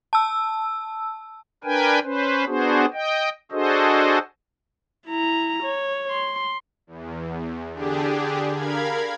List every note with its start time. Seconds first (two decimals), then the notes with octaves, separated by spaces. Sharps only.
0.13 A5 E6
1.64 D4 A#4 B4 G5 G#5
2.04 C#4 B4 C5
2.47 B3 D4 F#4 G#4 C5
2.94 D#5 G5
3.52 D4 F#4 G#4 A4 C5 D#5
5.07 E4 A#5
5.63 C#5
6.11 C6
6.87 E2
7.73 D3 D4 G4 G#4
8.53 A#4 F5 B5 G#6